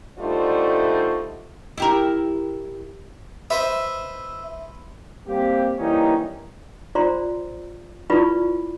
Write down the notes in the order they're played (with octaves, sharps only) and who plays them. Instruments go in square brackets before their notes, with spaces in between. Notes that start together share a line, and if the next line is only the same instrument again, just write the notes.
[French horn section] D3 G3 A3 D#4 F4 C5
[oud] E4 G4 A#4
[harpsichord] B4 C5 D#5 [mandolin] E5
[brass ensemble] G3 A#3 C4 G4
E3 G3 A#3 C#4 D#4
[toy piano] F4 C5 D5 A#5 C6
E4 F4 B4 D5 B5 C#6